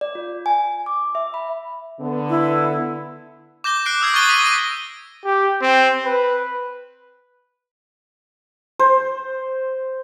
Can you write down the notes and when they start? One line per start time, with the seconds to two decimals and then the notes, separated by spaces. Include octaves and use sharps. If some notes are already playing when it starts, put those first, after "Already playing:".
0.01 D5
0.15 F4
0.46 G#5
0.86 D6
1.15 E5
1.34 B5
2.00 D3 B3
2.29 E4
3.64 D6 G6 A#6 G7
3.86 F#6 C7 D7
4.01 D#6 E6 G#6 C7
4.14 C#6 E6 G#6 A6 D#7 G7
4.29 D#6 A#6 B6 D#7
4.43 D#6 F#6 D#7 G7
5.25 G4
5.61 C4
6.05 B4
8.79 C5